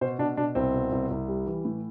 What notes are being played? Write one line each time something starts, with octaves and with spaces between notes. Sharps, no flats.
B2 C5
B2 D4
B2 D4
C2 C4
B2
C2
C2
G3
E3
A2